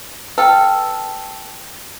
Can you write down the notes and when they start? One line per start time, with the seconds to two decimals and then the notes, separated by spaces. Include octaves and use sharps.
0.38 A4 B4 G5 A5